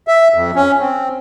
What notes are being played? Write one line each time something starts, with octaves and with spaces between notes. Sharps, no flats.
E5
F2
C#4
C4